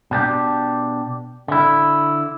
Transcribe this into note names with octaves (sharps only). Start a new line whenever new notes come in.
B2 D4 G4
D3 E4